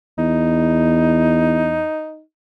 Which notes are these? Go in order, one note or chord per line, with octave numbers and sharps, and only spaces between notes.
E2 D#4